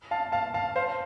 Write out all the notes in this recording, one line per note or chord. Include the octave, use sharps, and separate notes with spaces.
F5 A5
F5 A5
F5 A5
C5 F5